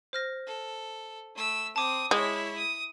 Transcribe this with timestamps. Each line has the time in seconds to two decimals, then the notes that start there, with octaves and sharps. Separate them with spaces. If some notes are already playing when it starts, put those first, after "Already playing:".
0.13 C5 F6 A#6
0.47 A4
1.35 A3 E6
1.76 C4 A5 D6 D#6
2.11 G#3 E4 C#5
2.57 D#6